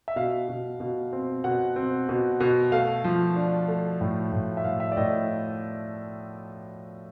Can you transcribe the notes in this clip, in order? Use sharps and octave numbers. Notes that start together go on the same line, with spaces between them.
E5
B2 F5
B2
B2
C4
B2 F#5
C4
B2
B2
A3 F5
F3
D4
A3
A2
A2
E5
A2 F5
E5
D5
A2 D#5